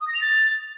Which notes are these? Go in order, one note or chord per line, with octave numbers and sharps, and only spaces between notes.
D#6
A#6
F7
A6